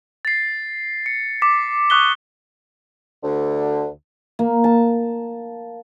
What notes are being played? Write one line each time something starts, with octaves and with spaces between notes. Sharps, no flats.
A6 C7
C#7
D6 B6
C#6 D#6 F#6 B6 G7
D2 D3
A#3
A5